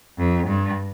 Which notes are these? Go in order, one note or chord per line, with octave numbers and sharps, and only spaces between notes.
F2
G2